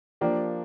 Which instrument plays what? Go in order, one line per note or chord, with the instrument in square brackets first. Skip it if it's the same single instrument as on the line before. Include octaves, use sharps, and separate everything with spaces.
[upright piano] F3 A#3 D4 G4